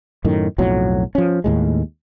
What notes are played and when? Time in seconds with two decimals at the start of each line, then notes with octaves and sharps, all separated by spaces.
0.24 F#2 A2 D#3
0.58 B1 F2 A2 F#3
1.15 F3 C#4
1.44 D#2 A2 G#3